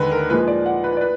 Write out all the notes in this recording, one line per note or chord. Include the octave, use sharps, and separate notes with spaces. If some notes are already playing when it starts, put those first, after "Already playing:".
Already playing: D#2 D3 G#3 B4
A#4
A#2 F3 G#3 B4
D5
F#5
B4
D5
B4